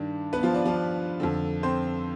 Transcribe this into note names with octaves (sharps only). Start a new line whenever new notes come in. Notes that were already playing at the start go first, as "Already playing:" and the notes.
Already playing: G2 D#3 D4
B3 B4
F3 F4
D4
F3 F4
F2 D3
C4 C5